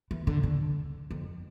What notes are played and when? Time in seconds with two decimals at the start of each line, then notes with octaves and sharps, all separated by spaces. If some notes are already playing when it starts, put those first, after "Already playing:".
0.11 E3
0.27 D3
0.43 D3
1.11 F2